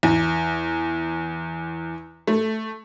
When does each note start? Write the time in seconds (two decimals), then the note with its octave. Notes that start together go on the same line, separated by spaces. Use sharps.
0.03 E2
2.27 A3